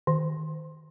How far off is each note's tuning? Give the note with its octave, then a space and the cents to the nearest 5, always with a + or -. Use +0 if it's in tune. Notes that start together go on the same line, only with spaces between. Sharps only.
D#3 +10